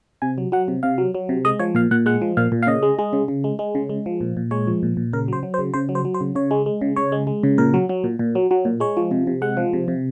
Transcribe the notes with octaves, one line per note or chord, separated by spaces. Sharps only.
C3 G#5
F#3
F#3 F#5
C3
C3 F5
F#3
F#3
C3
G#3 D#5
F3 C#5
A#2 F5
A#2 F#5
G#3 F#5
F3
A#2 F5
A#2
F5
C#3 D#5
G#3
G#3
C#3
C#3
G#3
G#3
C#3
G#3
F3
A#2
A#2
G#3 C#5
F3
A#2
A#2
C#3 A#4
F#3 C5
F#3
C5
C#3
C#3 C5
F#3
C5
F#3
C5
C#3
C#3 C#5
G#3
G#3
C#3
C#3 C#5
G#3
G#3
C#3
A#2 A#4
F#3
F#3
A#2
A#2
F#3
F#3
A#2
G#3 C#5
F3
C3
C3
G#3 F#5
F3
C3
C3